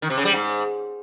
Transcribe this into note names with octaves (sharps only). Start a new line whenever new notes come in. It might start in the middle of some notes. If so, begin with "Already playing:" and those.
D#3
C3
C#3
G3
G#2